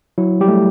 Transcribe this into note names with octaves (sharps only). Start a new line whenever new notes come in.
F#3 E4
G3 G4
A3